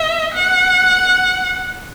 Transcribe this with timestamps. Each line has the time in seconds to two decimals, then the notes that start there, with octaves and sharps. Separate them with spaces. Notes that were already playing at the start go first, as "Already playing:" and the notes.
Already playing: E5
0.34 F#5